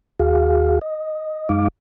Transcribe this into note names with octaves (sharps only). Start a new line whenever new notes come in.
D#2 F#4 G#4 F5
D#5
F#2 G#3 D#4 F5 D6